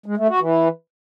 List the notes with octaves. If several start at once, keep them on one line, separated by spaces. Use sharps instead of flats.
G#3
A3
F#4
E3